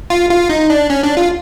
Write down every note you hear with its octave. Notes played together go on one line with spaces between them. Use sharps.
F4
F4
D#4
D4
C#4
D4
F4